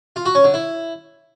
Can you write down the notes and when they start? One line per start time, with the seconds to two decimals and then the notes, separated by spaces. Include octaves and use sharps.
0.16 F4
0.25 F#4
0.35 C#4
0.44 D3
0.54 E4